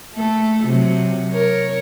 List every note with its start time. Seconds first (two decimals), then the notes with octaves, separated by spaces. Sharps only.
0.14 A3 A4
0.65 C3 F#3
1.31 A#4 C#5